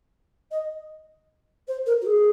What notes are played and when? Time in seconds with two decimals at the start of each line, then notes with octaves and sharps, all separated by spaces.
0.51 D#5
1.67 C5
1.86 A#4
2.01 F#4
2.06 G#4